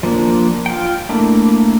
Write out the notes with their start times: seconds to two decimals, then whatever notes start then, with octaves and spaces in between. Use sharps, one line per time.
0.03 F3 A#3 D4
0.66 F4 G5
1.09 A3 A#3 D4 E4